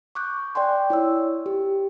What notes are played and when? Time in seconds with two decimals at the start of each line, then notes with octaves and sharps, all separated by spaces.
0.15 C#6 D6 F#6 G6
0.55 D5 G5 G#5 C6
0.90 E4 C#5 E6
1.46 G4